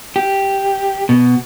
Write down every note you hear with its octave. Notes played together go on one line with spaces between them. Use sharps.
G4
B2